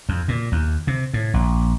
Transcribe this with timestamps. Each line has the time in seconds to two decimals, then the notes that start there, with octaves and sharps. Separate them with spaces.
0.09 F2
0.28 A#2
0.52 D#2
0.87 C3
1.14 A2
1.34 A#1